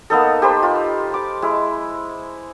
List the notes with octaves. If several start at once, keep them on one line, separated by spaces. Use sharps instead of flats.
A#3 B3 D#4 A4
G4 B4 C5 B5
F4
D6
G#3 E4